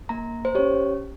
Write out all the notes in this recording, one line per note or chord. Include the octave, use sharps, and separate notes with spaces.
A#3 A#5
C5
C#4 G4 C#5